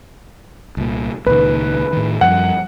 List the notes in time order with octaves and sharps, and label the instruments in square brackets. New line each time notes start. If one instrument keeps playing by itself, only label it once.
[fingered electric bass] C2 A#2
[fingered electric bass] C#2 A#2 D#3 [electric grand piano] B4
[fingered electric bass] A2 D#3
[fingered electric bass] F#2 F3 G3 [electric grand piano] F#5